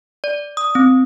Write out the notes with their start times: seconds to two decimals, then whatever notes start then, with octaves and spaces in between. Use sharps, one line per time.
0.24 D5
0.57 D#6
0.75 C4